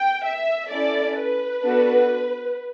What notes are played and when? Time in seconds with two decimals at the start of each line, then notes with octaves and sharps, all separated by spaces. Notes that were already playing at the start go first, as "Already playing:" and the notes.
Already playing: G5
0.25 E5
0.71 C#4 E4 A4 D5
1.17 B4
1.64 B3 D4 F#4 A4